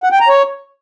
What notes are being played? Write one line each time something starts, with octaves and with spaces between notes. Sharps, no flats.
F#5
G5
A#5
C#5